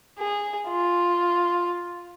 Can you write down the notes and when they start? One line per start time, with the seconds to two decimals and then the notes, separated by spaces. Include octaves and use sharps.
0.19 G#4
0.69 F4